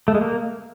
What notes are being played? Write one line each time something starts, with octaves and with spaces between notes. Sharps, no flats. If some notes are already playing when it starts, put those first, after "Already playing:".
A3
G#3
A#3